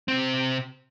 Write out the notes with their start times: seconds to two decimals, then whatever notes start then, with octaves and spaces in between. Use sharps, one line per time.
0.08 C3 C4